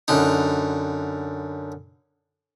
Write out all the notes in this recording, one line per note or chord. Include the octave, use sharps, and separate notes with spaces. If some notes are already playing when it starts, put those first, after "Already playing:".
F#2 D3 D#4